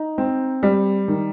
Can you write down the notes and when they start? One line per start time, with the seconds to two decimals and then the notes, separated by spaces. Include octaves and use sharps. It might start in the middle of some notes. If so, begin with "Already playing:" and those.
Already playing: D#4
0.18 C4
0.63 G3
1.08 D#3